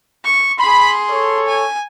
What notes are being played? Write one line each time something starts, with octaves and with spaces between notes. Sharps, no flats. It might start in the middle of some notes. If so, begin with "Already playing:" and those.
C#6
G#4 B5 C6
A4 C#5
G#5